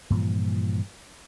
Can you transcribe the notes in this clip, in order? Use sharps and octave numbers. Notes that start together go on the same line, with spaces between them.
G2 A#2 E3 F3